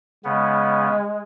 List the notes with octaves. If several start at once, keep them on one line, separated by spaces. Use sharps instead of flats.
C#3 G#3 B3